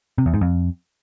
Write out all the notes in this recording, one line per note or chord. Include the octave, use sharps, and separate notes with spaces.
C3
E2
G#2
F2